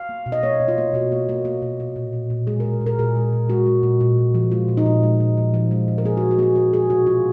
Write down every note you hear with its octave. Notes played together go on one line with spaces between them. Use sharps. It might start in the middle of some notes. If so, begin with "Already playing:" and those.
Already playing: F5
A#3
B2
D#5
A#3 C#5
B2
F4
A#3
B2 F#4
A#3
A#3
A#3
B2
A#3
A#2
A#2
A#2
G#3 G#4
A#4
G#3
A#2
A#4
A#2 G#4
G#3
A#2
G#3 F#4
G#3
A#2
A#2
A#2
F3
G#3 F4
A#2
D#4
A#2
G#3
A#2
F3
F3
G#3
G#3
A#4
A#3 G#4
F#4
A#3
F#4
A#3 F#4 G#4
A#3 F#4
A#3 G#4
B2 F#4
B2 F4